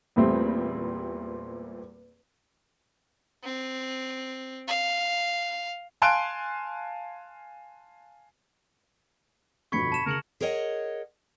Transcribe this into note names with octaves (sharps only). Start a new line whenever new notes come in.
E2 A#2 G3 A3 C4
C4
F5
F5 G#5 A5 C6 F#6 D7
G1 F2 B2 B5 C#6 G#6 C#7
A5 E7
C#3 A#4 C#7 F#7
G#4 A#4 C#5 D#5 F#5